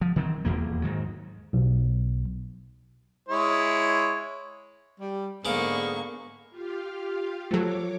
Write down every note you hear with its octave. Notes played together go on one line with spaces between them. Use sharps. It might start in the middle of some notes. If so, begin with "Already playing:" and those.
F3
D#3 E3 F#3 C4
D#1 B1 E2 A#3
G#2 D#3 F#3
B1
G#3 E4 C#5
G3
G#2 D3 G#3 A#3 B3 F5 C#6 D6
F4 G4 F5
F3 F#3 A3 A4 C#5 D6